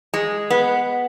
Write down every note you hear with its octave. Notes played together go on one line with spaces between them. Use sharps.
G#3
B3